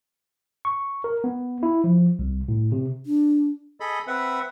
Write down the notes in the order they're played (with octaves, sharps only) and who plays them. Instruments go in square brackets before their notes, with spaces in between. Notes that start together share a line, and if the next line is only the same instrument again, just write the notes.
[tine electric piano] C#6
A#4
B3
E4
F3
C2
A2
C3
[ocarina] D4
[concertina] G#4 A4 D#5 B5
C4 B4 E5 F#5